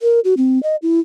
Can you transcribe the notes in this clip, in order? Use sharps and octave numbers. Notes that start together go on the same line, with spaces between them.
A#4
F#4
C4
D#5
E4